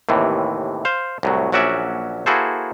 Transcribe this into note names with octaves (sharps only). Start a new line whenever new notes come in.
D#2 A2 C3 E3
C5 F5
C2 A2 F#3
A#1 F#3 C#4 F#4 D5 E5
A#3 E4 F#4 G#4 A4 C5